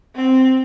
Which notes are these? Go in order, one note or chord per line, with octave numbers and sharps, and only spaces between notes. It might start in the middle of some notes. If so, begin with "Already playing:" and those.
C4